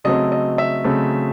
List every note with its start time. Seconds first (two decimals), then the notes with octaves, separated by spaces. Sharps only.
0.04 C#3 F#3 A3 C4 D#5
0.32 D#5
0.58 E5
0.84 C#3 F#3 A3 C4